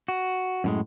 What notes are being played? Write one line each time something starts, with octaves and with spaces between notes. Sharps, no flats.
F#4
F#2 A2 G#3